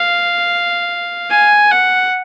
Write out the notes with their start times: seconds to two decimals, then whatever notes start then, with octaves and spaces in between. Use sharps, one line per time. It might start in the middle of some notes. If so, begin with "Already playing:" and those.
Already playing: F5
1.30 G#5
1.71 F#5